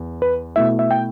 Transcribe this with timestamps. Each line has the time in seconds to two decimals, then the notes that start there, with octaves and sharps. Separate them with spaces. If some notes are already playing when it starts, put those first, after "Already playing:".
Already playing: E2
0.22 B4
0.56 B2 A3 E4 E5
0.79 E5
0.91 G5